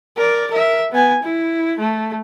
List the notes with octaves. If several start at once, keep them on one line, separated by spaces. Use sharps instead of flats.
A#4 D5
A#4 E5
B3 G#5
E4
A3